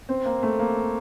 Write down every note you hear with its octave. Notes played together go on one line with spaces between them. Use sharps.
C4
A#3
A3
A#3